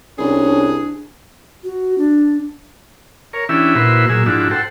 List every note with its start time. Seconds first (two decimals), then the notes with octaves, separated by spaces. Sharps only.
0.19 C2 C#4 D4 G#4
1.64 F#4
1.98 D4
3.33 A#4 C#5
3.49 E3 C#4 D4 E4 G4 E5
3.75 A#2 E4 F#4 B4 C5 E5
4.09 A#2 F#3 G#4 E6
4.26 G#2 F3 D4 E4 F#4
4.51 A4 C5 F#5 G5